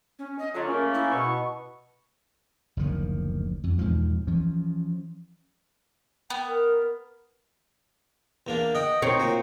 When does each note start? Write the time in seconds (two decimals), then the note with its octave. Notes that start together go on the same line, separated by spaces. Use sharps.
0.19 C#4
0.39 D#5
0.54 D3 F#3 F4
0.68 C#3 A3 A#3 C#4 A#4
0.94 E4
1.11 B2 B3 C#6
2.77 F#1 D2 D#3 F3
3.64 F2
3.79 E2 G#2 B2 F3
4.27 E3 F3 C#4
6.30 B3 G5
6.48 A#4
8.47 E2 A#3 D4
8.75 D#5 F#5 G5
9.02 C4 D#4 C#5
9.20 A#2 F#4